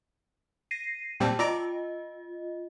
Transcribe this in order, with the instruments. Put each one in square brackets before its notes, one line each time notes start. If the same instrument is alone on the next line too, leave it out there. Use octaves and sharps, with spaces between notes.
[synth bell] A#6 C7 D#7
[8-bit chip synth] A#2 G3 C4 [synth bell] G5 A5
[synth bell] F4 D#5 [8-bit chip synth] D5 A#5 D6